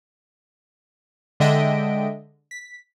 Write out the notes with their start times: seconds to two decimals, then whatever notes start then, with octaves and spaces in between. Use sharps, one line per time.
1.40 D3 G#3 D#5 E5 G5 D7
2.51 B6